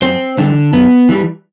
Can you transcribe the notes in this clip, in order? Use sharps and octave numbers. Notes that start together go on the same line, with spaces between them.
F#2 C4 C5
D3 E3 G3 D4
F#2 B3
E3 G3